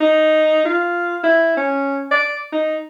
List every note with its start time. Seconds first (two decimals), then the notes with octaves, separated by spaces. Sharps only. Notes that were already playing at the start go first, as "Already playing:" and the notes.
0.01 D#4
0.65 F4
1.24 E4
1.57 C#4
2.11 D5
2.52 D#4